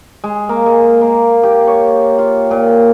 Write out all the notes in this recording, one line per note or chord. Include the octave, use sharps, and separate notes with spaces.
G#3
A#3
G#3
A#3
G4
C#5
F4
A#2